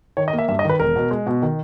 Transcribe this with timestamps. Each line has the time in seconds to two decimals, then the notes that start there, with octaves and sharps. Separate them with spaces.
0.17 D#3 C#5
0.28 D#5
0.33 A#3
0.39 E5
0.49 G2 E5
0.59 D#5
0.64 D#3
0.69 B4
0.80 E1 A#4
0.96 B2
1.11 G#3
1.27 B2
1.42 D#3